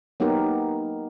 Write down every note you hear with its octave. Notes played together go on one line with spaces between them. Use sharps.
F#3 A#3 B3 D#4 G4 A#4